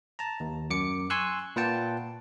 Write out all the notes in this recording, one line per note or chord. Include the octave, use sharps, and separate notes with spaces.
A5 A#5
D#2
F#2 D6 C#7
G#5 C6 C#6 E6 F#6
A#2 F4 B4 F#5 G5 A5